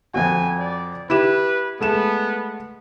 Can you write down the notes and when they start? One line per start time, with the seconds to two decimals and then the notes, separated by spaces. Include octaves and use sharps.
0.14 F2 C4 F#4 G#5
0.59 D5
1.10 E4 G4 B4 E7
1.81 G#3 A3 B3 E7